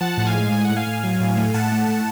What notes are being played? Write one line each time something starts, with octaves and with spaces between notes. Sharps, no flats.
F3 F#5 A5
A2 F#5
F5 G#5
G#3
A2 G#5
A2 F#5
F5 G#5
A2
F#3
A2
A3
A2 F#5 A5
A3
A2